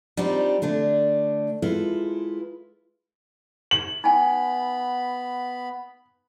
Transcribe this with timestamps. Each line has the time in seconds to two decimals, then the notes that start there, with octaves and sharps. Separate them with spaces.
0.17 G3 C4 D4 D#4 F4 G4
0.62 D3 A3 D4
1.62 G#3 E4 F4 A4 B4
3.71 F#7
4.04 B3 D#4 G#5 B5